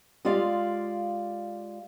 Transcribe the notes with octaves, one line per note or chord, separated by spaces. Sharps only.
G#3 F4 G4 D5 F5